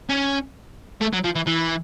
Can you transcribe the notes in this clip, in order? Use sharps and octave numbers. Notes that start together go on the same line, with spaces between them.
C#4
A3
F#3
F3
E3
E3